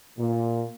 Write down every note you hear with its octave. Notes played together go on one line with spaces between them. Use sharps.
A#2